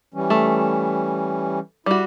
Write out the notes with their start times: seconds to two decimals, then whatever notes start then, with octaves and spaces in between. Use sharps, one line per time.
0.14 E3 G3 C#4
0.30 A3
1.86 G3 E4 F#4